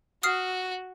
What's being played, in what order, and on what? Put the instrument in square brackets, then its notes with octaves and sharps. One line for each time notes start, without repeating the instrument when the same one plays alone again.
[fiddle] F#4 [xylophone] D#6 F6 C7